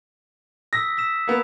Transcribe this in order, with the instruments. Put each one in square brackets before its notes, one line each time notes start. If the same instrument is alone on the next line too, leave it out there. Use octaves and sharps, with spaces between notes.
[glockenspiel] D#6 E6 B6 [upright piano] A#6
[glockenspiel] E6 B6 E7
[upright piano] A#3 B3